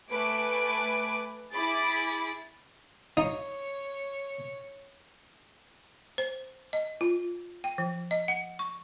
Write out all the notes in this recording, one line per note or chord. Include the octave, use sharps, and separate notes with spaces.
A3 B4 G#5 D6 D7
E4 G#4 B5 D6 A6
D#4 C#5
C5
D#5
F4
G5
F3
D#5
F#5
C#6